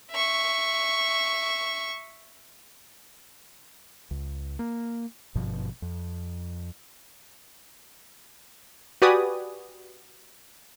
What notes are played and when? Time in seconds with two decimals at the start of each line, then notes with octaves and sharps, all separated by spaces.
0.11 E5 C#6
4.11 C#2
4.59 A#3
5.35 G#1 G2 B2 F3
5.82 F2
9.02 F#4 G4 B4 D5 G#5 D#6